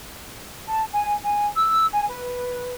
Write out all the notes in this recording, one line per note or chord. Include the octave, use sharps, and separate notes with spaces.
A5
G#5
G#5
E6
G#5
B4